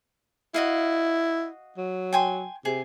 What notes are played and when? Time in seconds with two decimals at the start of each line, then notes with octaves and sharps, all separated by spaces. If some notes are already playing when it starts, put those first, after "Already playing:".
0.54 E4 F#4 D#5 F5
1.77 F#3
2.13 G5 G#5 C6
2.65 C3 G#4